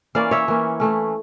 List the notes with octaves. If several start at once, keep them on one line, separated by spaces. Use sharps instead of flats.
E3 A#3 C#4 D5 F5
C#5 E5
E3 A#3 C#4
E3 A3 C#4